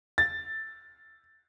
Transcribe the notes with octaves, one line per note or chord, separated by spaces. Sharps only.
A6